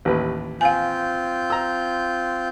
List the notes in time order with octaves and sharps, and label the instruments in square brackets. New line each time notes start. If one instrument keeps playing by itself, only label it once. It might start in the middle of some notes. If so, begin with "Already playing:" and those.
[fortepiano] A1 D#2 B4
[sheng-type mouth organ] C4 F4 G6 [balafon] F5 G#5
[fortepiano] A#5 E6